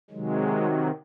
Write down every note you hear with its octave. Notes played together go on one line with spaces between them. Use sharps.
C3 D#3 F#3 G#3